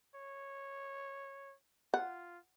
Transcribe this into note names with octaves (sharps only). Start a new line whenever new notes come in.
C#5
F4 F#5